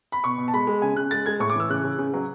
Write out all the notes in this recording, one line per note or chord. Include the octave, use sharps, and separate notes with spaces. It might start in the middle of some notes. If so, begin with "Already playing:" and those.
B5
B2 C#6
B2
A5
G#3 B5
G#3
C#3 G#5
C#3 F#6
G#3 A6
G#3 G#6
A2 C#6
D6
E3 E6
C#3 F#6
C#3
C#3
F#3